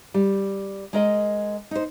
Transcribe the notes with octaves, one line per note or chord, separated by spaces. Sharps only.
G3
G#3 A#4 D#5
D#4 C5